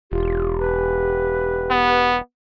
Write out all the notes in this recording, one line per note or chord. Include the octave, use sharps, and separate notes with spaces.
E1 F4 G4
B4
B3